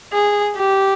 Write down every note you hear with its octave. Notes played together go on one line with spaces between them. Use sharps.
G#4
G4